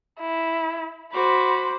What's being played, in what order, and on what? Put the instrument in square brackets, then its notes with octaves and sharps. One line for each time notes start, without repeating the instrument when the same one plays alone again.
[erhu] E4
[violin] F#4 D6 [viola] C5 [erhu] B5